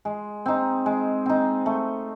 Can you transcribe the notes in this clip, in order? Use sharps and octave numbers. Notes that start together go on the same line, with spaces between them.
G#3
C4 D#4
G#3
C4 D#4
A3